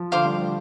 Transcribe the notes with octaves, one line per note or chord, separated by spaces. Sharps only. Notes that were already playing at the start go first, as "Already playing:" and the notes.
Already playing: F3
D3 C5 F5 D6
G3
A3